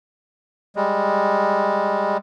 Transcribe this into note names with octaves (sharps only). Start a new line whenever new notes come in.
G3 G#3